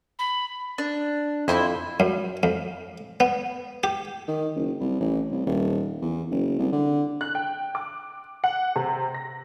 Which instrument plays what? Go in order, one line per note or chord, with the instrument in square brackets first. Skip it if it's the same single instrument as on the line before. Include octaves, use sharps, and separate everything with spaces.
[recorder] B5
[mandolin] D4
[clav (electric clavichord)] F2 [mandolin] E4 C5 B5
[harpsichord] F#2
F2
B3
G4
[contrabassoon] D#3
F#1
C2
A1
C2
D#1
E2
F#1
C2
D3
[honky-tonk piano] F#6
G5
D6
F#5
C3
A#6